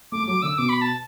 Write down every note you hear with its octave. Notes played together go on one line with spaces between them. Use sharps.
A3 D6
A3
F#3 D6
D3 E6
B2 D6
B5
A5